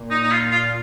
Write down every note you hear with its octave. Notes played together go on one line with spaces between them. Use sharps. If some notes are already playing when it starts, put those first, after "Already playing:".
Already playing: A#2
D#4
D#4
F4
F4